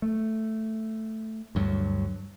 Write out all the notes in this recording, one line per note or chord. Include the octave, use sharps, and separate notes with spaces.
A3
D2 G2 F#3